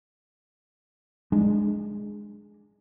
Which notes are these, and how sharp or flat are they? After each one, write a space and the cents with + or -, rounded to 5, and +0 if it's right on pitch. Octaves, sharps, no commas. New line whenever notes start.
G#3 +0 D4 +20